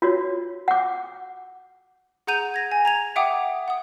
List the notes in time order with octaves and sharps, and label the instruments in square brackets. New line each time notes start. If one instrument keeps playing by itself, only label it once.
[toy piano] F4 F#4 C#5
F#5 D6
[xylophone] G#4 F#5 A#5 G6 D#7 F7
G#6 A#6
G#5
A#5 G#6 F7
E5 F#5 G5 D6 D#6
F#5 D#6